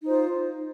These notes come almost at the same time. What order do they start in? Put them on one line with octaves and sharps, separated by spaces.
D#4 C5 F4